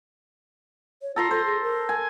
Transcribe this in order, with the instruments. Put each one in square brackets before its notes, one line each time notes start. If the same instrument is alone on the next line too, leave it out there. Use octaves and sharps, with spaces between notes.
[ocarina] C#5
[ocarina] F4 [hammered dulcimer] A4 A#5 C6
[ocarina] A4 [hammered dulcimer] C5
[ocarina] G#4
A#4
[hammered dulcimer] G#5